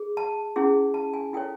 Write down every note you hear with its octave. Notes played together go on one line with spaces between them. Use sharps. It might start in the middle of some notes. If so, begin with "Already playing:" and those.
Already playing: G#4
A5
C#4 E4 G#4
A5
G#5
E4 A4 C#5 G5